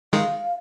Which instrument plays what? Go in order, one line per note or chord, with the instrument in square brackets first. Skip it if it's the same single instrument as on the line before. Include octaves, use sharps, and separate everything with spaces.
[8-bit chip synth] D#3 G#3 [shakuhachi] F5